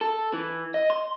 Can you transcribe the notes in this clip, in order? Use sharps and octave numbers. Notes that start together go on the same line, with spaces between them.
A4
E3
D#5
C6